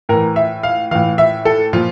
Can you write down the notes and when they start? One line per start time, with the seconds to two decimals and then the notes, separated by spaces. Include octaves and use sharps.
0.09 A2 E3 A#4
0.36 E5
0.63 F5
0.91 A2 E3 F5
1.18 E5
1.45 A4
1.73 A#2 F3 F4